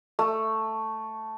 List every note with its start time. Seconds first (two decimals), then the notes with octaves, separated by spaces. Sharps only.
0.19 A3